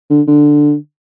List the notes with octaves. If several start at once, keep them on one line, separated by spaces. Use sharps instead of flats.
D3
D3